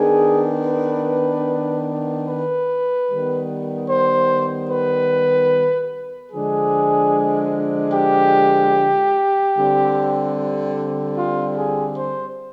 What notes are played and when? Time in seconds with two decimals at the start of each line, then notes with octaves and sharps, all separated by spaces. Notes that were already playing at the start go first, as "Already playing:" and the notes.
Already playing: D#3 B3 D4 G#4
0.67 B4
2.28 B4
3.09 D#3 G3 B3
3.90 C5
4.71 B4
6.32 D3 F3 G#3 D4 G#4
7.94 G4
9.55 D3 G3 C4
11.18 F4
11.58 G#4
11.98 C5